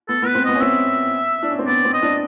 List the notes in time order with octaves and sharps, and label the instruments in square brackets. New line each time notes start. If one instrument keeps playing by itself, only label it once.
[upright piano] B3 [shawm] A4
[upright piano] B3
[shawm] B4
[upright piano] C4
[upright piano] B3 [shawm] D#5
[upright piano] C#4
[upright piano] C4 [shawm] E5
[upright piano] D4
C#4
C4
[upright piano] B3 [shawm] D5
[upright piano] C4
[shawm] D#5
[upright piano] D4